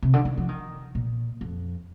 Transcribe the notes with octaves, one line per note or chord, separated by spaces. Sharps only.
C3
D3
D#3
F3
D#3
A#2
F2